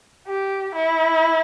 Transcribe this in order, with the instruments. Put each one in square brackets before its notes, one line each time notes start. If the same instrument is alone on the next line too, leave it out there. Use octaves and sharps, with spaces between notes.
[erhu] G4
E4